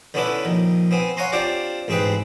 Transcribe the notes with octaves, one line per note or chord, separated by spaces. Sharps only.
D3 B3 C#4 D4 E4 B4
A#1 D#3
B3 C4 G#5
C#5 F5 F#5 G#5 A#5 C6
C4 D4 F4 G4 C5 D5
A1 G#2 C4 G#4 B4 G5